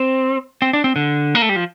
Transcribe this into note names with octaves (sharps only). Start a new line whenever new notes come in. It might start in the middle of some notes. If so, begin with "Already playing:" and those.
Already playing: C4
C4
D4
C4
D3
A#3
A3
G3
F3